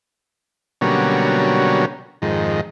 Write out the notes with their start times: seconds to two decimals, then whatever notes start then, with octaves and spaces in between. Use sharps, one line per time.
0.81 B2 D3 F#3 G3 A#3 C#4
2.22 F2 G#2 D#3